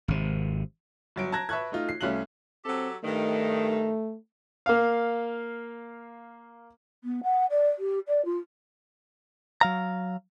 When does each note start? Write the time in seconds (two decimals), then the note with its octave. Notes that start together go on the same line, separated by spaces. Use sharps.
0.08 G#1 C3
1.16 G1 F#3 D7
1.32 A5 A#5 F#6 G#6 A#6
1.49 B4 E5 A5 C#6 F#6 G#6
1.72 A3 D#4 F4
1.89 C7
2.01 C2 A3 C#4 F5 F#6 F#7
2.65 F#3 C4 G4 A4
3.04 G2 D#3 A3
4.66 A#3 F5
7.04 B3
7.23 F#5
7.50 D5
7.79 G4
8.08 D5
8.25 F4
9.61 F#3 F5 A#5